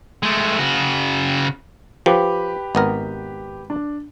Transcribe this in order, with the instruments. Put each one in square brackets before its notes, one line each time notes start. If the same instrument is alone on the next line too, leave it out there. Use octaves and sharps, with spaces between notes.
[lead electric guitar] G#3 A3
C#3 F#4
[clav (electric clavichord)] F3 [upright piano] G4 B4 D6
[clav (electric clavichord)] G#1 B3 A#4
[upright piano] D4